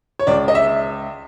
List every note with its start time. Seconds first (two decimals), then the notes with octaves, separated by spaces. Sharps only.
0.19 C#5
0.27 C#2 D5
0.48 D#5
0.55 E5